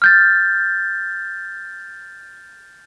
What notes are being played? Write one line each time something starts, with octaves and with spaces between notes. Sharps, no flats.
F6 G6 A6